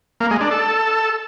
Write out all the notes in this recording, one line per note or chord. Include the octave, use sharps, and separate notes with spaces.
A#3
G#3
D4
A4